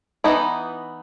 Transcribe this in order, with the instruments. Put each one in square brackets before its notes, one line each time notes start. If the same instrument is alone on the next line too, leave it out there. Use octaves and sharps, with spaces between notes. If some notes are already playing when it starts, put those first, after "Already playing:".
[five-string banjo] E3 B3 D#4 E4